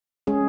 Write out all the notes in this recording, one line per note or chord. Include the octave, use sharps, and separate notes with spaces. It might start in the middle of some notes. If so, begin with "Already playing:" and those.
G#3 C#4 G#4